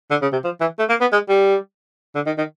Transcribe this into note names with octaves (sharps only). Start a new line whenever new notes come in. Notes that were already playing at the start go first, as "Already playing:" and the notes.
D3
C#3
C3
F3
E3
A3
A#3
B3
G#3
G3
D3
D#3
D#3